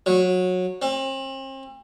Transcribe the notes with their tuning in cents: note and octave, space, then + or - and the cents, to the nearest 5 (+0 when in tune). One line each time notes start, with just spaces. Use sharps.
F#3 -20
C4 +40